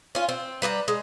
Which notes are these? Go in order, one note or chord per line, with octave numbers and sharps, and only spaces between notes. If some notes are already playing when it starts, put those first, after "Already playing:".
C#4 F4
C4
G3 B4 D#5 A#5
G#3